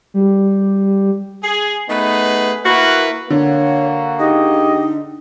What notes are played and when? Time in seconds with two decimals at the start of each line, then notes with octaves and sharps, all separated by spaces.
0.14 G3
1.43 G#4
1.88 A3 B3 D#4 G#4 B4
2.65 A#3 E4 F#4 A#4 B4
3.30 D3 A#3 F#4 C#5
4.19 D#4 G4 G#4 D#5